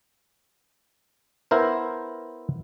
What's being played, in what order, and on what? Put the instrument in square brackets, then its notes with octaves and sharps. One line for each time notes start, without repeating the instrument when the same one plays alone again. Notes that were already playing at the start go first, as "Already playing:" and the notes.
[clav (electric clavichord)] B3 E4 A#4 C5